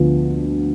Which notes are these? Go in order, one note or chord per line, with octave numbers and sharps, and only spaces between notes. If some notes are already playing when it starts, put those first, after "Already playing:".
Already playing: D2 D3 F3 B3 F4